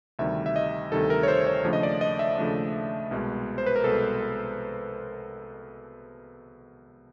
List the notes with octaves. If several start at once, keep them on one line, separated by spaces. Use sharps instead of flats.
D2 C3 D#3 G3 E5
E5
D#5
D2 C3 D#3 G3 A4
A#4
C#5
C5
C#5
D#2 C#3 F3 A3 D4
D#5
D5
D#5
E5
D#2 C#3 F3 A3 D4
C2 B2 G#3
C5
B4
A#4
C2 B2 G#3 A4